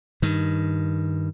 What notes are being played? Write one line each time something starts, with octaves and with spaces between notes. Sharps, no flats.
G2 D#3